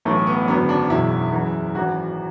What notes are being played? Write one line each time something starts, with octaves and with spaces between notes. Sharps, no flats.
B1 A2 E3 A3
B3
G#1 F#2 D3 F#3 B3
D4
F#1 E2 B2 E4
F#1 F#2 E3
G#1 F#2 E3 F#4